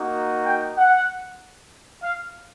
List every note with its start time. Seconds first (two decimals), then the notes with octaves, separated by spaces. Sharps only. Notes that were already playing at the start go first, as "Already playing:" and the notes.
Already playing: A#3 D#4 F#4
0.46 G5
0.77 F#5
2.03 F5